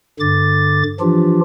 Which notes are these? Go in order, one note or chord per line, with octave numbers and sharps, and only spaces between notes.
G2 D3 D6 A6
E3 F3 D4 F4 G4